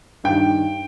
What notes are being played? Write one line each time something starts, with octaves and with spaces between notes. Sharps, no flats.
G2 D#3 G5